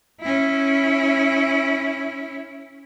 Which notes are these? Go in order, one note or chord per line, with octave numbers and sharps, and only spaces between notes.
C#4 E4